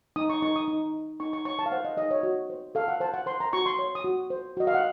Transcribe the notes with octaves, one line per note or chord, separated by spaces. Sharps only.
D#4 D#6
C#6
D#4 C#6
D#6
D#4
D#4
D#4 C#6
C#6
C#5 C#6
A5
F5
C5 F#5
D#5
D#4 D#5
C#5
F#4
C5
A4 F5
F#5
C5 A5
F#5
C5 C6
A#5
F#4 C#6
C6
C#5
D#6
F#4
C5
F#4 D#5
F5
F#5